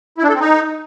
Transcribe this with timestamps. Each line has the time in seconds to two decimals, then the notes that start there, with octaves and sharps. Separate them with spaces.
0.18 E4
0.24 D4
0.29 A4
0.35 C4
0.40 D#4